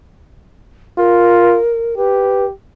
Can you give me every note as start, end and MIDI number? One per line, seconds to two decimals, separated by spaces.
0.98 1.59 65
0.98 1.95 70
1.97 2.52 67
1.97 2.45 71